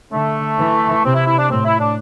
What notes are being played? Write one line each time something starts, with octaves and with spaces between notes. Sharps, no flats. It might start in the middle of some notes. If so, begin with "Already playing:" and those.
D3 A3
E3
C3 C4
E4
E4
D4
A2 C4
E4
D4